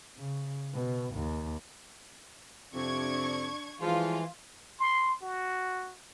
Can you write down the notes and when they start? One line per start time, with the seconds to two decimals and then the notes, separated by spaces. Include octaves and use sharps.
0.17 C#3
0.73 B2
1.14 D#2
2.74 F2 C3 D4 C#6 G#6
3.81 E3 F3 G3 G#3 F4
4.80 C6
5.22 F#4